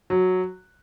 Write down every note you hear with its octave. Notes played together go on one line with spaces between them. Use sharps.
F#3